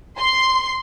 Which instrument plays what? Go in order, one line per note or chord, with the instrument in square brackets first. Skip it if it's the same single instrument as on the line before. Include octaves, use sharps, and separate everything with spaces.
[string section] C6